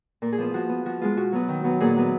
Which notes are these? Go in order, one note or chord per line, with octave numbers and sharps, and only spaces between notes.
A#2 A#4
G#4
F3 B3 F4
F3 F#4
B3
F3 F#4
G#3 B3 F4
B2 F#4
F#3 B3
D#3
F#3 B3
A#2 G#4
F#3 B3